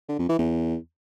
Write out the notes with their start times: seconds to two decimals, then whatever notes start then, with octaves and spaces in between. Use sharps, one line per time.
0.09 D3
0.19 F2
0.29 E3
0.39 E2